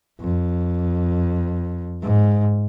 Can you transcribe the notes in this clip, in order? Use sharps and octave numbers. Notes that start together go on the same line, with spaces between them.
F2
G#2